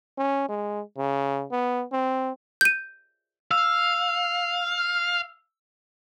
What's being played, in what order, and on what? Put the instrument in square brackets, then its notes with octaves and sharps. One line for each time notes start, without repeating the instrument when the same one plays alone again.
[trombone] C#4
G#3
C#3
B3
C4
[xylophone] G6 D#7
[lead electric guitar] F5 [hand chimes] E6